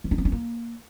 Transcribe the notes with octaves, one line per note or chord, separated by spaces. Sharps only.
E3
D4
B3
C#4
A#3